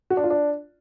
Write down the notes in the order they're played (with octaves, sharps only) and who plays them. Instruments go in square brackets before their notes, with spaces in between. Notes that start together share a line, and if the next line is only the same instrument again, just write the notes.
[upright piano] F#4
D4
F4
D4